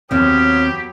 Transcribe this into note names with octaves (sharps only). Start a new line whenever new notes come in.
D#2 F#3 B3 C4 G4 C#5 D#6 F6